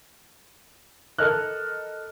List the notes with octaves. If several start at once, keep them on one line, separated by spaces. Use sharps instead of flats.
A4 A#4 D#5 F6 F#6